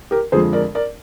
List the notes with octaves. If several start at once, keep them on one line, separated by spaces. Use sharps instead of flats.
G4 A#4
F2 D3 F3 G#3 G#4 C5
A#4 D5
A#4 D5